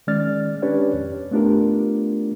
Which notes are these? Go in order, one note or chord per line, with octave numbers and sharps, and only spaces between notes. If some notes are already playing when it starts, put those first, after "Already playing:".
D#3 G#3 C#4 D5 F6 A6
C#4 D4 G4 B4 C#5 D5
F2
A3 B3 D4 F4 G4 A#4